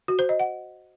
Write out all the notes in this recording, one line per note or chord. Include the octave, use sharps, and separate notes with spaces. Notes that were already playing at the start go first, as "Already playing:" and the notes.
F#4
C5
D#5
F#5